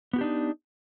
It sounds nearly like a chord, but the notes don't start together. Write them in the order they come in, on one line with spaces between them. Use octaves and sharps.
B3 F#4 G4 D4 D#4